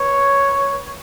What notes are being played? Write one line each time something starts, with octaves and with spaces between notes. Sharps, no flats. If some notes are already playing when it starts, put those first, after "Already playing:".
Already playing: B4 C#5